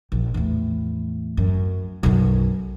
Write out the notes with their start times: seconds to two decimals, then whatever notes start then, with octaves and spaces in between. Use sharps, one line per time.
0.12 A#1
0.34 E2 A2
1.37 F#2
2.03 B1 F#2